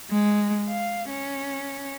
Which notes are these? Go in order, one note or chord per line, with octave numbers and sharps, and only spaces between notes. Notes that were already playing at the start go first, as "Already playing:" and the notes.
G#3
F5
C#4